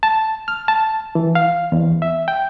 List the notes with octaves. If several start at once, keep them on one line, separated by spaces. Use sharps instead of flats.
A5
F6
A5
E3
F5
E2
E5
G5